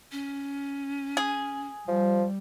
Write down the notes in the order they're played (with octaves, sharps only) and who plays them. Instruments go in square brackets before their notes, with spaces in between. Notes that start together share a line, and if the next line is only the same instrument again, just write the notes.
[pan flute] C#4
[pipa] G#4
[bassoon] F3 [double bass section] G3